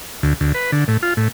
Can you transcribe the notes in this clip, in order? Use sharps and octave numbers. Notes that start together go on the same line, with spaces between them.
D2
D2
B4
D3
A2
F4
A2